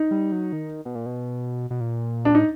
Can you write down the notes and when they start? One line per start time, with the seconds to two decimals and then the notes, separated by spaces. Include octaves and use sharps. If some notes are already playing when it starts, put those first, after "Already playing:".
Already playing: D#4
0.11 G3
0.32 F#3
0.53 D#3
0.85 B2
0.95 A#2
1.06 B2
1.70 B2
1.81 A#2
2.25 D4
2.35 A2 D#4